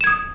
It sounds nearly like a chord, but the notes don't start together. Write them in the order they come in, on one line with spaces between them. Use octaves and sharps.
E7 G#6 D#6